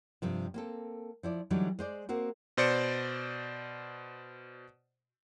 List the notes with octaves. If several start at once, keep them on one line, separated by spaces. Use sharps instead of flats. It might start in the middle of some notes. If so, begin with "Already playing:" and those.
G2 C3 F3
A#3 C4 A4
F3 E4 D5
D3 E3 F#3 G3 D#4
G#3 C5 D5
A#3 C4 F#4 A#4
B2 C5 D5 C#7